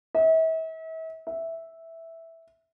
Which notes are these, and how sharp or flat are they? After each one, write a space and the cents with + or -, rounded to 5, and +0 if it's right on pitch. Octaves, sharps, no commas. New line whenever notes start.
E5 -40
E5 -5